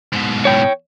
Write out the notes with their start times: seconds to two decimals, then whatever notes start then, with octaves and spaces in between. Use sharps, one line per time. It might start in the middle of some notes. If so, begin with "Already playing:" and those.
0.13 G#2 B2
0.45 C#5 G5